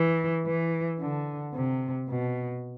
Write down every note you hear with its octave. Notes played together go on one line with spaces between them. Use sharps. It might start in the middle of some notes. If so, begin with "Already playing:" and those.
Already playing: E3
E3
D3
C3
B2